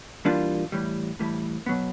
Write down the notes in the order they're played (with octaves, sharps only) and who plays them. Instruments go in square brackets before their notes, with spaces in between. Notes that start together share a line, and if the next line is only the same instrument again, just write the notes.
[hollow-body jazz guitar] E3 G3 A#3 D4 F4
A2 E3 G3
A2 E3 G3
B2 F#3 B3